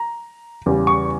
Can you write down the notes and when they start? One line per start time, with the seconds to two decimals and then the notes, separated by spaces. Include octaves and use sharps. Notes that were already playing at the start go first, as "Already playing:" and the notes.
Already playing: A#5
0.66 E2 C#3 G3
0.87 C#6